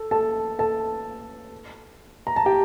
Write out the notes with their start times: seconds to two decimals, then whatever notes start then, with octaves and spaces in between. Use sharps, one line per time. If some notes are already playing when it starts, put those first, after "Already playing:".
Already playing: A4
0.11 A4 A5
0.59 A4 A5
2.27 A#5
2.36 A5
2.46 G4 G5